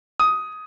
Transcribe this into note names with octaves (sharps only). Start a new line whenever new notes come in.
D#6